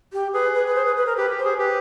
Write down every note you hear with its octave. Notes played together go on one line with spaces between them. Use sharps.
G4
G#4 B4
B4
B4
C5
B4
B4
A#4
G4 B4
G4
C5
G#4
G4 B4